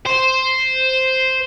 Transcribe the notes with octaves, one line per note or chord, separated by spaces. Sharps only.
C5